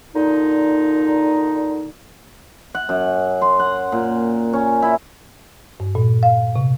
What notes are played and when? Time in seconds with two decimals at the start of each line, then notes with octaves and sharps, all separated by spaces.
0.15 A#2 D3 D#4
2.75 F#5
2.89 F#2
3.42 C6
3.59 F#5
3.92 A#2
4.53 C#4
4.82 E4
5.80 G2
5.95 A#2
6.23 F5
6.56 C3